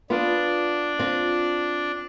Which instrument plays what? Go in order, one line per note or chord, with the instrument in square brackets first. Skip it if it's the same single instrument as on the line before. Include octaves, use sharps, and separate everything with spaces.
[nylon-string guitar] B3 F4 [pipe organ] D4
[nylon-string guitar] C4 F4